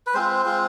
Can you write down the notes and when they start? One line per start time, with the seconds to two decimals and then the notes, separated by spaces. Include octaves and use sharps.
0.07 B4
0.14 G#3 C4 F4 C5
0.45 G#3 C4 F4